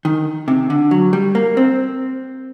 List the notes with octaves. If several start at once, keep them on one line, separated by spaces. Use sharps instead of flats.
D#3
C3
D3
F#3
G3
A#3
C4